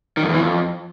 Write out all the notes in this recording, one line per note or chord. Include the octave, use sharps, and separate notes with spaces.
D#3
F2
E2
E3
F2